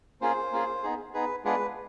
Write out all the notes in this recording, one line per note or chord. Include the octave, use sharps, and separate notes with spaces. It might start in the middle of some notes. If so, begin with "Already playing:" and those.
A#3 C#4 F4 G#4 C5
A#3 C#4 F4 G#4
B3 D#4 G#4
B3 D#4 G#4 B4
G#3 B3 D4 F4 G#4 B4